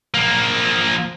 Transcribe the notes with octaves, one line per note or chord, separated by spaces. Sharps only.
F3 A#3